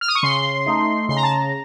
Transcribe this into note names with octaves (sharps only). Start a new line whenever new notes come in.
F6
D#6
C#6
C#3 C6
A3 D#4
C#3 C6
A#5
A5
A#5